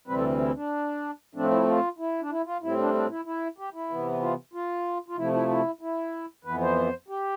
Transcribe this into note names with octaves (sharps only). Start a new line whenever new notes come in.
D2 C3 E3 G3 C4 B4
A4
E4
D4
A2 F3 A3 C4 D4
E4
F4
E4
D4
E4
F4
A2 G3 C4 E4
D4
D4
E4
E4
G4
E4
C3 E3 B3
F4
F4
F4
C3 F3 A3 E4
E4
E4
E4
F2 E3 B3 B4
C5
G4